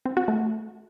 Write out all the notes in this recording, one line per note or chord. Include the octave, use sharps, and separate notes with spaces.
C4
F#4
A3